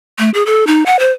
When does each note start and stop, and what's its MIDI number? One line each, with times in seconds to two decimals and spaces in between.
0.19 0.30 57
0.34 0.43 68
0.46 0.66 69
0.67 0.83 63
0.86 0.99 78
0.99 1.11 72